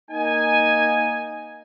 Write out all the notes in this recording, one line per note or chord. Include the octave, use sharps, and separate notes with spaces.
A#3 D#4 G#5